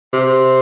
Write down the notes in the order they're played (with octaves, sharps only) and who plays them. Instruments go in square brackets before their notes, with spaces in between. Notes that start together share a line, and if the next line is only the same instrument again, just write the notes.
[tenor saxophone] C3